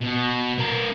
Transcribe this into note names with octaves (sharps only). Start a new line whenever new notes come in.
B2
B3 A#4